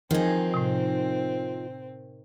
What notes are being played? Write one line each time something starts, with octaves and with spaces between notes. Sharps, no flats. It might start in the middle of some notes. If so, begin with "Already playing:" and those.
D#3 F3 C4 D#4 G#4
A2 C3